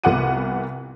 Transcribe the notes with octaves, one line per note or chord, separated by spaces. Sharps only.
C2 B3 F4 F#5 D6 D#7